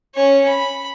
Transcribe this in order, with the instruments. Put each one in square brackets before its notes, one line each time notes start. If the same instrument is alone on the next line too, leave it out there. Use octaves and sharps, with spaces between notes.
[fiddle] C#4 C#5
B5